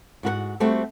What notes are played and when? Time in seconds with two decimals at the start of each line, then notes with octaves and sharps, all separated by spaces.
0.23 G#2 F#4 A#4 F#5
0.60 G3 A3 C4 F#4 G4 A4